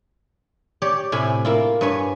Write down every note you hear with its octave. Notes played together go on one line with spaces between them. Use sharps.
G4 C#5 D5
A2 C3 G#5 B5
A#3 E4 F4
G2 B4 C#5 G#5